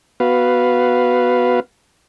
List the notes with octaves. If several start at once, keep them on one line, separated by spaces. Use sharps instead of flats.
B3 F#4 B4 F5